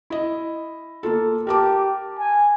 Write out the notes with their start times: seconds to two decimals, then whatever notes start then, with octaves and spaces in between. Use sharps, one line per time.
0.10 E4 D#5
1.03 A#3 F4 A4
1.47 G4 A#4 A5 D6
2.18 G#5